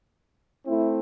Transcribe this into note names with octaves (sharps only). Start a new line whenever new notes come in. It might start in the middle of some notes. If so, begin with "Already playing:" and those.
A3 C4 E4